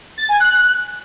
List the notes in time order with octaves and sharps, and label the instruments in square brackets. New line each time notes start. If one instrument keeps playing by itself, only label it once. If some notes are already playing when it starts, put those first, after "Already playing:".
[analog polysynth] A6
G#5
F#6